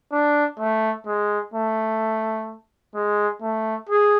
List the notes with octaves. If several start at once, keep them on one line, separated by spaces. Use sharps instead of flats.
D4
A3
G#3
A3
G#3
A3
G#4